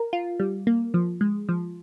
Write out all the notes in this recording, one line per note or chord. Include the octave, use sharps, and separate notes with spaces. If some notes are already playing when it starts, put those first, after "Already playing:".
Already playing: A#4
F4
G3
A#3
F3
G#3
F3